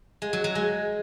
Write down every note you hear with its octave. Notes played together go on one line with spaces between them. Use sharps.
G#3
F#3
F#3
G#3